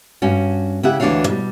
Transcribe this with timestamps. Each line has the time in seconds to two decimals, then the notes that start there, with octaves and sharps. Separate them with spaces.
0.22 G2 C#4 F#4
0.83 C#3 E4 G4 E5 F#5
1.00 D2 E3 D4 F#4 C#5 F5
1.27 B2 G3